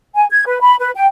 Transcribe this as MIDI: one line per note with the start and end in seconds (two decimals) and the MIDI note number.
0.15 0.25 80
0.31 0.45 92
0.46 0.61 71
0.61 0.75 83
0.80 0.91 71
0.96 1.07 79